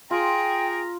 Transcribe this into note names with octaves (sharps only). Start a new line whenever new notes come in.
F4 G#4 G5 A#5